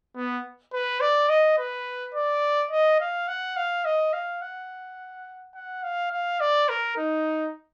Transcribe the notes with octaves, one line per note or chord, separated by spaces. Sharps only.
B3
B4
D5
D#5
B4
D5
D#5
F5
F#5
F5
D#5
F5
F#5
F#5
F5
F5
D5
A#4
D#4